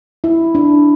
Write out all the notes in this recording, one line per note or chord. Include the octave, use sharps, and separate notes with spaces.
E4
D4